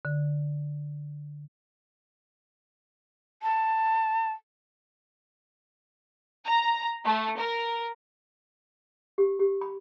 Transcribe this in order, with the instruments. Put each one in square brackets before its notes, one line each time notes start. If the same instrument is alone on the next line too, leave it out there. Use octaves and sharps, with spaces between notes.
[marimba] D3
[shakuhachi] A5
[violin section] A#5
A3
A#4
[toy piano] G4
G4
B5